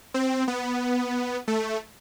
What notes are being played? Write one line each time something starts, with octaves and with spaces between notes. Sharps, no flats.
C4
B3
A3